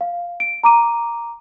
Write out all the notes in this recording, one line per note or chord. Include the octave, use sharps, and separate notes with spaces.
F5
D7
A#5 D6 D#7